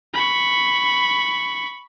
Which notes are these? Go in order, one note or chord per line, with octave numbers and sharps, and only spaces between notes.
B5 C#6